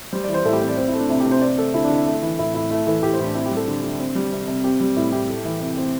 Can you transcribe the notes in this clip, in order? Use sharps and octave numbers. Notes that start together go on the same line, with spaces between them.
G3 C5
D5
E3
C5
A2 E4 A4
G4
C4 C5
D5
C4 C5
E4
A3
D4
C3 E4
G4
C3
C5
C4 D5
A3 A4
D3 E4
D4
D3 E4
A3
E3
A2 E4
A2 E4
A3 E4
E3 A4
A2 G4
C5
A2 D4
C4 E4
G4
G3
A4
D3
D3
C4
G3
C3
C3
C4 G4
G3
A2 E4
A2 G4
A3
E3
C3
C4